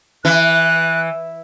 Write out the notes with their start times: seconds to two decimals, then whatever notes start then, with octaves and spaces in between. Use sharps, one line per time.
0.25 E3 F#6